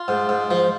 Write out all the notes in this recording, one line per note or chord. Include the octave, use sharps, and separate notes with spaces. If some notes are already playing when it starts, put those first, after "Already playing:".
Already playing: F4
G#2
G#2
F3